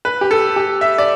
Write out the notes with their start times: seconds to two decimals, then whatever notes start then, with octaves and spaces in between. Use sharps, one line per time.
0.05 B4
0.21 G4
0.31 A4
0.56 G4
0.81 E5
0.98 D5